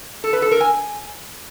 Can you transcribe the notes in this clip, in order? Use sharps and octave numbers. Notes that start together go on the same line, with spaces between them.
A4
B4
A4
A#4
G#5